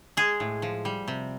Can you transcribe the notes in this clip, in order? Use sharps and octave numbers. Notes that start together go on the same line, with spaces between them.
G#3 G#4
A2
F3
G3
C3